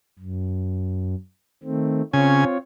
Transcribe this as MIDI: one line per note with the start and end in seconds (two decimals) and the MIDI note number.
0.19 1.15 42
1.63 2.02 51
1.63 2.02 57
1.63 2.02 60
2.13 2.45 49
2.13 2.58 60
2.13 2.58 65
2.13 2.58 73
2.13 2.45 80